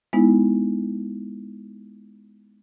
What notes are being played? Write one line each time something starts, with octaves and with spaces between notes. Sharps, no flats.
G#3 B3 D#4 E4